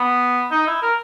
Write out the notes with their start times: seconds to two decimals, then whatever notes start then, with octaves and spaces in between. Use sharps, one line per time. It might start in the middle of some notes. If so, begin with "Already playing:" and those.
Already playing: B3
0.51 D#4
0.67 E4
0.82 A#4